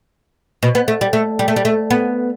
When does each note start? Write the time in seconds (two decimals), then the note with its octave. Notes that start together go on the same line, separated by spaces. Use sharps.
0.63 B2
0.75 B3
0.88 A3
1.01 G3
1.13 A3
1.39 G3
1.48 A3
1.56 G3
1.65 A3
1.90 B3